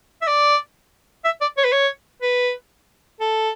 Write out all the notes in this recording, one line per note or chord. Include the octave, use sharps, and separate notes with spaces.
E5
D5
E5
D5
C#5
B4
C#5
B4
A4